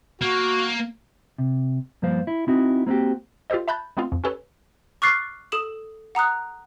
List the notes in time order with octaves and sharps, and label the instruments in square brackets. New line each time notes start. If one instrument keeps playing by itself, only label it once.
[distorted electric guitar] A#3 [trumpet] F#4
[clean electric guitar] C3
G2 F3 A#3 C5 F5
E4
C4 D#4 E4 F#4
A#3 C4 D#4 F#4 G4
[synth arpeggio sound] F4 G4 A4 C5 D#5
E5 A5 B5 F#6 G6 A6
G#3 A3 B3 C4 F4
F2
C#4 G4 A4 B4 C#5
[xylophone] C#6 D6 F6 F#6 A6 C7
A4 D#6 E7 F#7
F#5 A#5 D#6 F#6